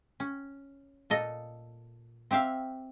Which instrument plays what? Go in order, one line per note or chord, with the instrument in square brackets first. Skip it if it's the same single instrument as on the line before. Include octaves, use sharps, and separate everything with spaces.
[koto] C#4
A#2 A4 D#5
C4 G4 E5 F5